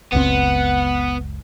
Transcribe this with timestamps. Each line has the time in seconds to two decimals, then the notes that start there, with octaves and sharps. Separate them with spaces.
0.13 F#1 C#2 B3 C4 F#5